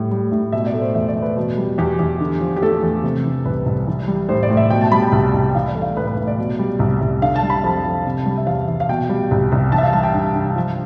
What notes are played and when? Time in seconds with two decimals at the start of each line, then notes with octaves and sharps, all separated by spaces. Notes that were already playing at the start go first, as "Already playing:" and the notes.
Already playing: A2 G3
0.11 G3
0.32 A2
0.52 B2 E5
0.66 D5
0.74 A3
0.81 C5
0.95 E2 E5
1.08 D5
1.16 E2
1.22 B4
1.37 B2
1.58 G3
1.78 E2 G4
1.99 E2
2.20 D3
2.41 F3
2.56 G4
2.62 A3 A4
2.83 E2
3.04 C3
3.25 E3
3.45 C2 B4
3.66 C2
3.87 E3
4.08 G3
4.29 A2 C5
4.43 D5
4.50 A2
4.57 E5
4.70 B2 G5
4.81 A5
4.92 G3 B5
5.02 G5
5.12 C2
5.34 C2
5.50 G5
5.55 E3 F5
5.68 D5
5.75 A3
5.82 F5
5.96 A2 B4
6.07 B4
6.17 A2
6.27 D5
6.38 B2
6.59 G3
6.79 C2
7.01 C2
7.21 D3 F5
7.36 A5
7.42 G3
7.50 B5
7.64 F2 A5
7.85 F2
8.05 C3
8.26 G3
8.37 E5
8.47 E2 F5
8.68 E2
8.80 F5
8.89 B2 G5
9.09 G3
9.31 C2
9.52 C2
9.72 E3 A5
9.78 E5
9.83 F5
9.93 G3 A5
10.03 G5
10.14 G2
10.35 G2
10.56 F3